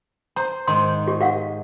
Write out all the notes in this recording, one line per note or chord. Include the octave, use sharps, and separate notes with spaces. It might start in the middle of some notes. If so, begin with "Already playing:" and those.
C5 A#5
G#2 D#3 C6
G4
G4 F5 F#5